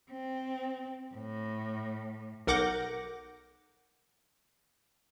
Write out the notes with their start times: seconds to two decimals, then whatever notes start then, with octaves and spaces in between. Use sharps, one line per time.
0.11 C4
1.14 A2
2.47 B1 A#4 F#5 D6 G6 A#6